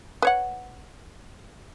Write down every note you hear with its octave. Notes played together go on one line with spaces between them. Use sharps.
B4 C#5 F#5